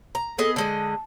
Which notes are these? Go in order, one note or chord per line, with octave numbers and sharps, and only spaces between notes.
A#5
B3 G#4 A4 D#5
D3 G#3 D#5 A5